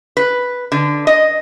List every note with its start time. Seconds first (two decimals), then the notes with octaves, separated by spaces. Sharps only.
0.17 B4
0.72 D3
1.07 D#5